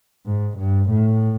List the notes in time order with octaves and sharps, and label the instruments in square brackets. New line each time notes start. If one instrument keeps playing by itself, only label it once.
[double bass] G#2
G2
A2